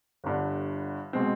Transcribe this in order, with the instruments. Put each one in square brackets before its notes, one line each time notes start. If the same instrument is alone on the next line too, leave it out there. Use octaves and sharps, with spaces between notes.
[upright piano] G1 G2 D3
B2 G#3 C4